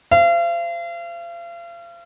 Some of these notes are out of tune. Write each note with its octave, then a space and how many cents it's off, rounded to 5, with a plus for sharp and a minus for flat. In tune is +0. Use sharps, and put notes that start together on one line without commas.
C5 +0 F5 -40